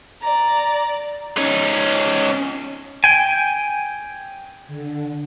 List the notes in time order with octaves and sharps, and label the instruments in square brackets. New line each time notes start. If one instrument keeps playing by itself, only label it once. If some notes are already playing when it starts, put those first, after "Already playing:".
[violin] D5 A#5
[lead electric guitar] C#4 D#4
[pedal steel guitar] G5 G#5
[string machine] D3